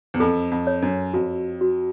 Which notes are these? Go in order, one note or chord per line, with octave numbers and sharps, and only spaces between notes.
E2
F2 A4
F2
C#5
F#2
F2 F#4
F#4